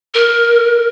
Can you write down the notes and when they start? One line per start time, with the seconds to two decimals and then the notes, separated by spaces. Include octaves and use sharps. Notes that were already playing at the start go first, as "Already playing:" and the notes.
0.14 A#4